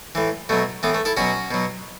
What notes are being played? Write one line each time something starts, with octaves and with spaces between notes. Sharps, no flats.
A2 E3
B2 F#3 A3
A2 E3 B3
A3
E4 A4
B2 F#3 C#4 F#4
B2 F#3